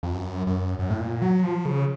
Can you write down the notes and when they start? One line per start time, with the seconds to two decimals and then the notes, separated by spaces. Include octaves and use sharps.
0.03 F2
0.14 F#2
0.47 F#2
0.79 F#2
0.90 A2
1.00 A#2
1.22 F#3
1.44 F3
1.65 C#3